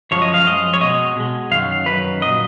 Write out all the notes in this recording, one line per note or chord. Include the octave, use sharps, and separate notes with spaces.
F#2 F3 G#3 C#5
D#5
F5
F#2 F3 G#3 D#5
C#5
B2 G#3 D#5
B2 G#3
F#2 D#3 F#3 F5
F#2 D#3 F#3 B4
A#2 F#3 D#5